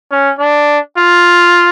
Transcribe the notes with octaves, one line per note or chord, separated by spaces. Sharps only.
C#4
D4
F4